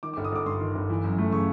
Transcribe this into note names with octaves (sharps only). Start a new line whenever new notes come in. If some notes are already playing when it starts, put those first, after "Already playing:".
D#3 D6
G1 D6
D#6
G1 D6
G2 C6
D#3
G1
E3
F#2
A3
C#3 C#6